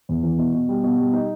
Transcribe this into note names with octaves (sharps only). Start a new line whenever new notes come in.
E2
E3
B2
B2
G3
B2
G3
D#4